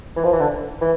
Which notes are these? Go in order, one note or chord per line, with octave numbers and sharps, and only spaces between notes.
E3
F3
E3
D3
E3